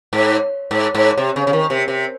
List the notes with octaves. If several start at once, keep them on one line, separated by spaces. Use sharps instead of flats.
G#2
G#2
G#2
C3
C#3
C#3
D#3
C3
C3